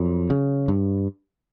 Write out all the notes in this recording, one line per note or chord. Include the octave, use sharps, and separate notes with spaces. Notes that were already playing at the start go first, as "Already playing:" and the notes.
Already playing: F2 F#3
C#3
G2